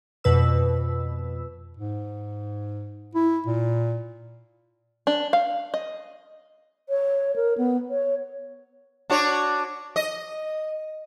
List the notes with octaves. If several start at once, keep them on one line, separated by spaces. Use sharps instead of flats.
F2 B2 B4 E6
G#2
E4
A#2
D4
F5
D#5
C#5
A#4
B3
C#5
D4 F#4 C#5
D#5